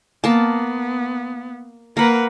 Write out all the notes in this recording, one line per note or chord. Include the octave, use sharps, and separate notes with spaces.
A#3 B3 A5
A#3 A#4 B4 F#5